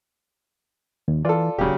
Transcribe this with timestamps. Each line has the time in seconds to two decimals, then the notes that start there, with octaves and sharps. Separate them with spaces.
1.08 D#2
1.25 E3 F4 A4 D5
1.59 D#1 C#3 F#3 G4